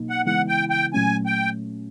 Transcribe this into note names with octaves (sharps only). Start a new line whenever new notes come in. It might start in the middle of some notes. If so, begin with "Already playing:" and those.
Already playing: B2 F#3 A#3 D#4
F#5
C#3 E3 G#3 B3 E4 F#5
G5
G5
A#2 F#3 A3 C#4 G#5
G5